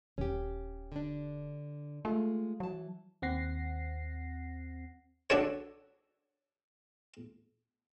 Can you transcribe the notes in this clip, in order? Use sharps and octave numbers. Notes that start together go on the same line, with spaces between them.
D#1 C#4 G4
D3 D4
G#3 A3 F4
E3 F#3 A5
D#2 C4 F#5 A#6 C7
D4 F#4 A4 C#5